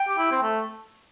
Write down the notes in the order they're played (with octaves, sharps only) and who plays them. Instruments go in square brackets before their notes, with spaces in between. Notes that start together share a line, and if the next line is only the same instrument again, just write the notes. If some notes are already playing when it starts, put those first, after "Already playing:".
Already playing: [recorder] G5
[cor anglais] G4
E4
C4
A3